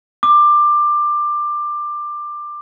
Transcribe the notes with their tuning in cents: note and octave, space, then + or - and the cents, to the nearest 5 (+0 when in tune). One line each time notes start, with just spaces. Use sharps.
D6 +20